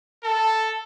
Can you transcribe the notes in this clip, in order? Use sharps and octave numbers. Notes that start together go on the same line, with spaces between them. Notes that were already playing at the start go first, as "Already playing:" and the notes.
A4 A5